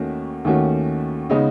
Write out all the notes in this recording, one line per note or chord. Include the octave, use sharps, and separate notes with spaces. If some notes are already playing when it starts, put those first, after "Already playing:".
Already playing: D#2 D#3 A3 C#4 F#4
D#2 D#3 A3 C#4 F#4
C#3 G#3 B3 D#4